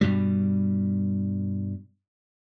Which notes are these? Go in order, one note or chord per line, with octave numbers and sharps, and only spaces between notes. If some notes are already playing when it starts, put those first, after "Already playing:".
G2 B2 G3